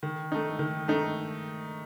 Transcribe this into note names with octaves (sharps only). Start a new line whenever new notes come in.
D#3
A3 D#4
D#3
A3 D#4